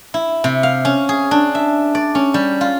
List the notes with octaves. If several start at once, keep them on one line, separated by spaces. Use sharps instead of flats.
E4
C3
F5
C#4
G#4
D4
E5
D5
C#4
G3
F4